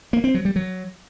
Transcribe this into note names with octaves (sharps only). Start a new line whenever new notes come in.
A#3
C4
F#3
G3
F#3